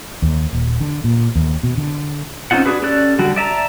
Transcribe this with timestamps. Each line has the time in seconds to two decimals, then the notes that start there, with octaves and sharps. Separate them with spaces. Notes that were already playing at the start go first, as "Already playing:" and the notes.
0.22 D#2
0.53 D#1
0.81 D3
1.04 A#2
1.35 D#2
1.63 B2
1.78 D3
2.51 C4 C#4 D#4 F4 F#5
2.66 D4 F#4 G#4 B4
2.82 C#4 G4 A4 D5 F#6
3.19 D3 G3 F#4
3.36 D5 E5 A5 A#5